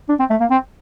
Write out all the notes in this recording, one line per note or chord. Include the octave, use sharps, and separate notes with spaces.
D4
C4
A3
A#3
C4